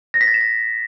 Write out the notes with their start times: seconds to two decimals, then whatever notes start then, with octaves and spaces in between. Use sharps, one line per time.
0.14 A#6
0.21 B6
0.28 A6
0.34 E7
0.41 A#6